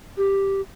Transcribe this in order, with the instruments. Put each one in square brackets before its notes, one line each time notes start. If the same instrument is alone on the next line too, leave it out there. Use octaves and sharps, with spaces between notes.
[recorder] G4